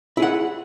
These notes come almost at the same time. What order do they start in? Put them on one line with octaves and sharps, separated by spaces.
E4 G#4 F#5